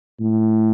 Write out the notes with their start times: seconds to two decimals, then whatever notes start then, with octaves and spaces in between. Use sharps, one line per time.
0.20 A2